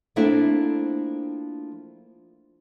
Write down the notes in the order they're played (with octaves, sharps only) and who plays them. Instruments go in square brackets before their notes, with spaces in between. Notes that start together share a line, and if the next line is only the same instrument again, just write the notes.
[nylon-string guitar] F3 A3 A#3 C4 D4 E4